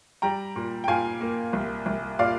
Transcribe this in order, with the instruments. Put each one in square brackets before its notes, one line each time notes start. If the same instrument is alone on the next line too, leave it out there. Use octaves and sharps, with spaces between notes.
[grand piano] G3 G5 A#5
A#2
G5
A#2 F5 G#5
A#3
C2
C2
A#2 D5 F5